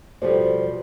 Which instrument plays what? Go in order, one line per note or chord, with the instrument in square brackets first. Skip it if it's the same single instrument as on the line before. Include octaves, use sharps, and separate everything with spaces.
[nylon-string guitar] B2 F3 G3 [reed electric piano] A4 C5 D5